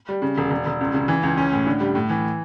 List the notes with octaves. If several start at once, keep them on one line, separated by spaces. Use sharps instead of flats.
G3
C#3
E1
E1
E1
C#2
C#3
E3
C#2
C#4
A2
D3
G3
A2
E3